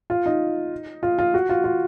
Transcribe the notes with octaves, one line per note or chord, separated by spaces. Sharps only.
F4
D#4
F4
F4
F#4
F4
F4